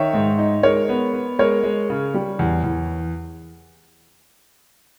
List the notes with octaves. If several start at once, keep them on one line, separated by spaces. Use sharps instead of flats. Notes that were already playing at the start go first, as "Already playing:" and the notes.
Already playing: D#3 C#5 E5
G#2
D#4
G#3 A#4 C#5
B3
B3
G#3 A#4 C#5
G#3
C#3
G3
E2
E2